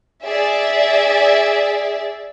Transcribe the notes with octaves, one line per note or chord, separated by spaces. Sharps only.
G#4 D5 E5